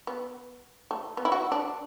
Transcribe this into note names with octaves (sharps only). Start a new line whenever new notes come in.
B3
A3
B3
E4
F#4
D4